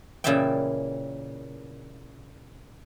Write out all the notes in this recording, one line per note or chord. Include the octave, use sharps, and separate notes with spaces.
A#2 C#3 E3 D5 E5 G5